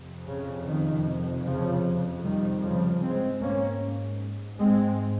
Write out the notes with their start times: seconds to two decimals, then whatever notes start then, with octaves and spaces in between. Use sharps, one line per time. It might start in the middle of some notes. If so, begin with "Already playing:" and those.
Already playing: F2 C3
0.27 C#3
0.67 D#3
1.45 C#3 F3
2.23 D#3 G3
2.63 C#3 F3
3.02 G#2 G#3 C4
3.42 A#3 C#4
4.60 G#3 C4